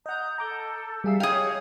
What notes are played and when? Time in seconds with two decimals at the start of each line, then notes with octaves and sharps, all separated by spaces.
0.06 D#5 F#5 A#5 D#6 G6
0.38 A4 A#5 D6 G6
1.04 G3 G#4 E5 F5 E6
1.20 G#4 C#5 D#5 F5 G5